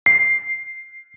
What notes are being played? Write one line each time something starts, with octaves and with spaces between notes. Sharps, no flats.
C7